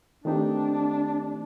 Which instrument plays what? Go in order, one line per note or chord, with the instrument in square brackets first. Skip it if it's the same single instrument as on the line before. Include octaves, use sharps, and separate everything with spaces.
[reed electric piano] D#3 A3 C4 D#4 G4 [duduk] D4